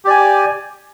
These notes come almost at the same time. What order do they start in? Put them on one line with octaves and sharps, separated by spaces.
G4 D5 G#5